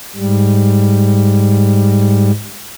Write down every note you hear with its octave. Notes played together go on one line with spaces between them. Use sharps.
G#2 G3